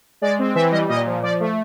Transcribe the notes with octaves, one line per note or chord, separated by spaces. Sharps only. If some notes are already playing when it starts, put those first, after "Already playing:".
G#3 D5
C4
E3 E5
G3 D#5
A#2 D#5
F3
F3 D5
A3